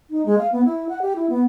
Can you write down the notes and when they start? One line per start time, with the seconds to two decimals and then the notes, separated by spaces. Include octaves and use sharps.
0.10 D#4
0.26 G#3
0.38 F5
0.52 B3
0.65 E4
0.89 F#5
1.02 G4
1.16 E4
1.29 B3